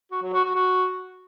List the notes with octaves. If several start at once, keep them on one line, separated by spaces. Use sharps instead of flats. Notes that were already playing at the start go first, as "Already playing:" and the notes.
F#4
F#3
F#4
F#4
F#4